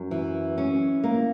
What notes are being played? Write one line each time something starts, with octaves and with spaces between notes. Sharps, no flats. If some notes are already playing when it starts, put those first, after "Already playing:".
Already playing: F#2
E3
C#4
A#3